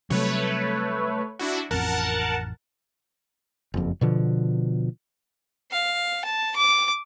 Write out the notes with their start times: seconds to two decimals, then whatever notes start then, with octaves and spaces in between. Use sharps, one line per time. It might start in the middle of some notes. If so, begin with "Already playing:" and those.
0.10 C3 F#3 G3 A3 B4 C#5
1.39 D4 E4 F#4
1.71 A1 F2 A#4 F#5 A5
3.74 F#1 F2
4.01 B2 D3 F3
5.72 F5
6.25 A5
6.56 D6